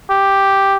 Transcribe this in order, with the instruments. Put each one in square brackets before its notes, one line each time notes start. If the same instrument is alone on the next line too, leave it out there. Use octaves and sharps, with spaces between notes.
[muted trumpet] G4